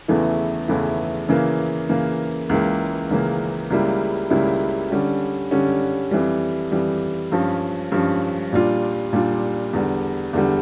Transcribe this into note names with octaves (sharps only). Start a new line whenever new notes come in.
E2 C#3 E3 A3 E4
E2 C#3 E3 A3 E4
C#3 E3 A#3
C#3 E3 A#3
C#2 C#3 E3 A#3
C#2 C#3 E3 A#3
C#2 C#3 G3 A#3 E4
C#2 C#3 G3 A#3 E4
D3 G3 C#4
D3 G3 C#4
F2 E3 G3
F2 E3 G3
G2 F3 C#4
G2 F3 C#4
A#2 G3 D4 F4
A#2 G3 D4 F4
E2 D3 G3
E2 D3 G3